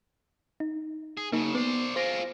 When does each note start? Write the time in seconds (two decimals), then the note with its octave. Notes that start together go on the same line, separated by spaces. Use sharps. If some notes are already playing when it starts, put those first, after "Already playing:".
0.60 D#4
1.17 G#4
1.32 F#2 C#3 A#3 D#4
1.55 B3 C5 D5
1.96 F4 G#4 C5 A#6 D7